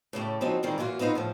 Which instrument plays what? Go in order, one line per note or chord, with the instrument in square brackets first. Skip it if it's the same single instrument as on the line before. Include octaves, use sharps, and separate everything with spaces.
[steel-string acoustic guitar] A2 C#3 A3 G4
C#3 F3 F#3 C4 D#4
D#3 G3 G#3 C4 F4
E3 F#3 A#3 F4 F#4 C5
B3 C4 D#4 F4 B4
A2 C#3 F3